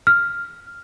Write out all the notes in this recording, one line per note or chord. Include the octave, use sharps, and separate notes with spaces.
F6